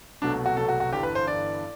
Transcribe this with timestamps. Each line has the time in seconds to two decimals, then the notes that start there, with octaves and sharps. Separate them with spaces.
0.22 C2 B2 F#3 A3 D4
0.46 F#4
0.57 C2 B2 F#3 A3 A4
0.69 F#4
0.80 F#4
0.92 G1 G2 E3 G4
1.03 B4
1.15 C5
1.26 G1 G2 E3 D5